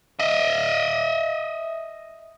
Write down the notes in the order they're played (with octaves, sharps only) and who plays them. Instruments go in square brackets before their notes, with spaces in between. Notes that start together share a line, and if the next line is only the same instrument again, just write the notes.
[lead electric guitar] D#5 E5